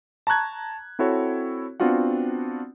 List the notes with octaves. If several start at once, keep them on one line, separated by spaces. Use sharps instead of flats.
A5 A#5 C#6 F#6 G#6
C4 E4 F#4 A4 C#5
B3 C4 D4 F4 F#4 F#5